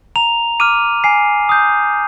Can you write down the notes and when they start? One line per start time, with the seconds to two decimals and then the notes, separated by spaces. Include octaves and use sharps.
0.16 A#5 F7
0.60 D6 F6 D#7
1.04 G#5 C7
1.49 D#6 G6